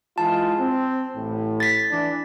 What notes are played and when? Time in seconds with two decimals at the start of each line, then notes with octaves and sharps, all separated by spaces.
0.18 E3 G#3 F4 A5
0.60 C4
1.16 A1 A2
1.60 A6 B6
1.91 E3 D4